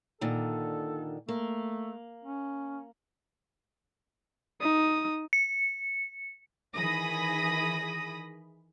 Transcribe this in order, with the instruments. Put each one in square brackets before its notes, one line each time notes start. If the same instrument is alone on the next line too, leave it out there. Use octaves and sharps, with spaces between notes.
[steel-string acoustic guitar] A#2 D3 D#3 [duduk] A4
[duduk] A3 [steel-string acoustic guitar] A#3
[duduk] C#4
[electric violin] D#4 D#6
[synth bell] C#7
[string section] D#3 E3 G#4 B5 D#6 A#6